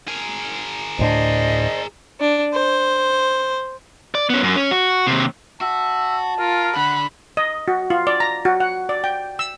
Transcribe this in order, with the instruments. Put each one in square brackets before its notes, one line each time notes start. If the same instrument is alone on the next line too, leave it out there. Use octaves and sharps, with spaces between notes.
[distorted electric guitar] G#4 A#4
[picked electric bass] D2 A2 D4 [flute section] C5 D5 D#5
[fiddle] D4
C5
[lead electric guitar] D5
B3 C#4
F#2
C#4
F#4
D#2 C3
[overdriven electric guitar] F#4 [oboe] E5 [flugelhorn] A5
[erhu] F4 [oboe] A#4
[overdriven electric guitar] D3 [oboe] F#5 [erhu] B5
[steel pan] D#5
F#4
F4
D5
A#5
F#4
F#5
D5
G5
E6